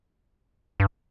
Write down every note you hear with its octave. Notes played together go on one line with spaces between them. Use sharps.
G2